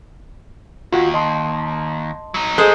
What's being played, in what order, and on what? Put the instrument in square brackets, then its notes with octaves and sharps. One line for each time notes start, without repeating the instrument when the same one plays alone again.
[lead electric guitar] D#2 [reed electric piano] F4 F#4
[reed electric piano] D#5 A5 C6
[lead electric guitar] F#3 D#4
[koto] G#3 C5 [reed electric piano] A4 D#5